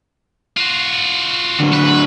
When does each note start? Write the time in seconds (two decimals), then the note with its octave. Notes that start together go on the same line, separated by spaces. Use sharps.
0.57 F4 F#4
1.60 D3 F#3
1.73 D3 F#3 B4